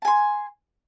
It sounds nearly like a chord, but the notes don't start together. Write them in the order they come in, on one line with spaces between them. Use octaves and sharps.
A5 G#5 C6